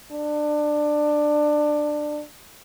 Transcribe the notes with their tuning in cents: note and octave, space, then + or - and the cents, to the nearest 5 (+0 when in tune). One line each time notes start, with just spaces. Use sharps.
D4 +20